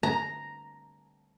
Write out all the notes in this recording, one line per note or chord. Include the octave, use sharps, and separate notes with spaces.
A#5